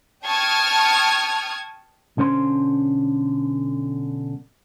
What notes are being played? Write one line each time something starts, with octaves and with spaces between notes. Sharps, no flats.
G5 A5 C#6 D#6 F6 G#6
B1 D3 C#4 C5 C6